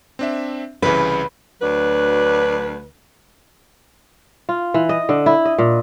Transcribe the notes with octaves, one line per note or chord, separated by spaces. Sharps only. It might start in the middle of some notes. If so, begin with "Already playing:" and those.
C4 D4 E5
C2 C#3 E3 B4
D2 F#3 D4 B4
F4
E3
D#5
D3
E4
D#5
A#2